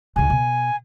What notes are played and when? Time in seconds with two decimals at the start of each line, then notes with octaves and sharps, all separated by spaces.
0.16 C#2 C#3 G#5
0.30 B2